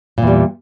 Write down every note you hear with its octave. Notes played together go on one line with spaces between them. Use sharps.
E2 A#2 G3